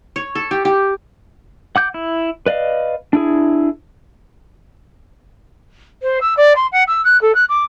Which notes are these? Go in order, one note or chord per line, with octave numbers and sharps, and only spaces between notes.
C#5
A4
G4
G4
F#5 D6 G6
E4
B4 D5 D#5 F5
D4 E4 G#4
C5
E6
D5
C6
F#5
E6
F#6
A4
F#6
D6